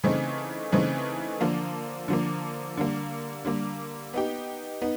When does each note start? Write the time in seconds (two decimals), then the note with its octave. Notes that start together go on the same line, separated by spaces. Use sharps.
0.04 C#3 E3 A3 C4 D#4
0.72 C#3 E3 A3 C4 D#4
1.40 D3 F3 A#3
2.08 D3 F3 A#3
2.77 D3 G3 A#3
3.45 D3 G3 A#3
4.14 B3 D#4 G4
4.82 B3 D#4